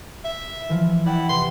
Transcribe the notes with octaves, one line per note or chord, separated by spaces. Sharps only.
E5
E3 F3
E4 D5 F#5 G5
C3 B4 C6